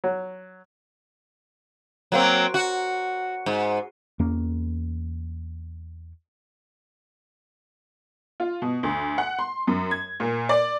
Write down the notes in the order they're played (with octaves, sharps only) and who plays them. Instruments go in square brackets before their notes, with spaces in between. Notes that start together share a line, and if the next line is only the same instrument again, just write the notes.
[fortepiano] F#3
[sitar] F#3 A#3 C4
F#4
G#2
[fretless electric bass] E2 A#3 C#4
[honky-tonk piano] F4
B2
D2
F#5
C6
F#2
G#6
A#2
D5